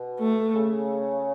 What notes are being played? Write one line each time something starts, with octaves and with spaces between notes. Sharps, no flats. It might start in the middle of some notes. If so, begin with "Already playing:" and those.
Already playing: B2
A3
C#3